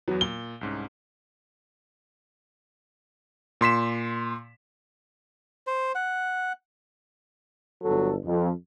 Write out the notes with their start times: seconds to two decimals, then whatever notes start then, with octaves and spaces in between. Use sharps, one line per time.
0.08 E2 F#3 B3
0.21 A#2 G7
0.61 C2 G#2 C#4
3.61 A#2 C6 B6 E7
5.67 C5
5.95 F#5
7.82 G1 F#3 A4
8.25 F2